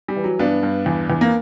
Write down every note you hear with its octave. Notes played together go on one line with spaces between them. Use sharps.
G3
E3
F#3
G2 B3 D4
G2
E2
E2
A#3